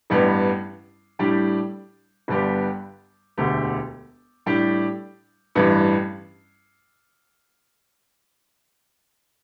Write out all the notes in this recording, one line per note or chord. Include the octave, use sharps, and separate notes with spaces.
A1 G2 G3 B3
A2 G3 D4 G4
G1 G2 G3 B3 G4
E1 D2 D3 A3 G4
A2 G3 D4 G4
A1 G2 E3 G3